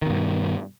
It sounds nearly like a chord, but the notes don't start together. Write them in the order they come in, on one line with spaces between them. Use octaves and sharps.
D#3 B2 G2